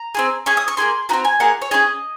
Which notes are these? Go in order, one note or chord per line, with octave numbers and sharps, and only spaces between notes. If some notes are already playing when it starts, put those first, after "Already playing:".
Already playing: A#5
C4 F4 G#4
C#4 G#4 C#6
D#6
C#6
A#3 F4 G#4 C6
C4 D#4 F#4 A#5
G#5
A#3 F4 G#4 F#5
C#5
C#4 F4 G#4 D#5